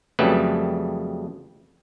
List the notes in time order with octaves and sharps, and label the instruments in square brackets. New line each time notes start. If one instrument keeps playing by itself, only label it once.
[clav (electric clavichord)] F2 C#3 F#3 G3 A3 B4